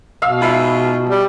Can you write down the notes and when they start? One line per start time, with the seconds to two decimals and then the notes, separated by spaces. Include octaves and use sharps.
0.22 B2 F5 E6
0.42 G#2 F4 E5 B5
1.10 G3